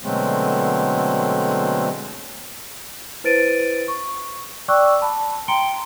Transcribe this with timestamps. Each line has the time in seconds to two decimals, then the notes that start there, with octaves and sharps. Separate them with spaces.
0.03 B2 D3 F#3 G#3 A3 C4
3.24 E4 B4 C5 A6 D7 D#7
3.88 C#6
4.68 D5 G5 C#6 D6 E6 F#6
5.02 A5 B5
5.48 G5 A#5 C6 C#7 D7 G7